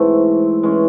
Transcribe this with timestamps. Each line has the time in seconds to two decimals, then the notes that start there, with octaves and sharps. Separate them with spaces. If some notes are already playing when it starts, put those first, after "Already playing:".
Already playing: G#2 E3 A3 C4
0.63 E3 G#3 C#4